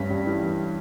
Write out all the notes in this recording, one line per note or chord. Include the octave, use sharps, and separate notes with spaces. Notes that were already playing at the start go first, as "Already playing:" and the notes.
Already playing: G2 C#4 B6
G3
E3